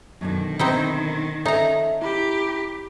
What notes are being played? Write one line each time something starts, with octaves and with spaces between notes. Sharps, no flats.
F#2 B2 D3 D#3
C4 D#4 E4
C#4 D#4 A4 E5 A#5
E4 G4 B5